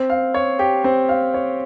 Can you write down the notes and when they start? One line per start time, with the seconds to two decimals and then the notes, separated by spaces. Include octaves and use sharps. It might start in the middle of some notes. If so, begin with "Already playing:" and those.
Already playing: C4
0.10 F5
0.34 C#5
0.59 G4
0.84 C4
1.09 F5
1.34 C#5